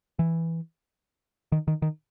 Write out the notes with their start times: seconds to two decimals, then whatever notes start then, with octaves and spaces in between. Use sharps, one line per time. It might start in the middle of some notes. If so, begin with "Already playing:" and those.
0.19 E3
1.52 D#3
1.68 D#3
1.82 D#3